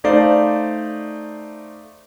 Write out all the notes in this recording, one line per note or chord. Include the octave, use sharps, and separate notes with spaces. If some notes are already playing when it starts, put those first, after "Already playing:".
A3 D#4 C5 D5 F5